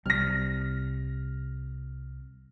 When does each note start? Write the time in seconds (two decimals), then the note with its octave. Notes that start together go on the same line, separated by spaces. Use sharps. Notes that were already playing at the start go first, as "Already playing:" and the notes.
0.06 C2 G3 C4 F6 A#6